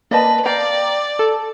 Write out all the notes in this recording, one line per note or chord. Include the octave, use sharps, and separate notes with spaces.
A#3 B4 D5 D#5 A5
D5 F5 G5 A#5 D6
A4